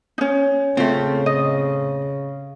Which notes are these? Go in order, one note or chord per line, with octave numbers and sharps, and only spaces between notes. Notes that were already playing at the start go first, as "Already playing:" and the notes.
C#4 D#4
C#3 A3 C4 F4
D#5